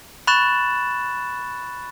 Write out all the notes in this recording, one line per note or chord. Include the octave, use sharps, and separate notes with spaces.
B5 C#6 F#6 A6 E7 F#7